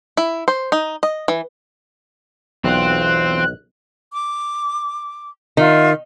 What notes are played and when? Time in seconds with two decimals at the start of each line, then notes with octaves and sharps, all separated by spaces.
0.17 E4
0.48 C5
0.72 D#4
1.03 D#5
1.28 E3
2.64 B1 E2 C4 F4 F#6
4.12 D6
5.57 D#3 F4 E5